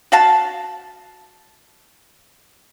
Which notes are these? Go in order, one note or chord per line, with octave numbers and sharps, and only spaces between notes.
F#4 F5 A5